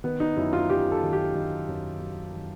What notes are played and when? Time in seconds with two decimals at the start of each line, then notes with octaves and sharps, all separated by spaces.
0.04 D#3 B3
0.20 D#4
0.36 F#2 E4
0.53 F4
0.70 F#2 G4
0.92 A4
1.03 D#3
1.13 G4
1.35 D#3
1.68 F#2
2.01 F#2
2.34 D#3